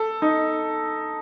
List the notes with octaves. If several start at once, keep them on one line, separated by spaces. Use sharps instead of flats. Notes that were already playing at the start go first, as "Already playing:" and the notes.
Already playing: A4
D#4